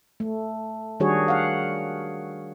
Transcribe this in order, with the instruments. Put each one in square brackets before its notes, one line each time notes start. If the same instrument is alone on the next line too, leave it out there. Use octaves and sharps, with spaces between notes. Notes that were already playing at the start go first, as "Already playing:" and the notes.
[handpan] A3
D#3 G3 D4 F#4 G#4 C#5
F5 F#5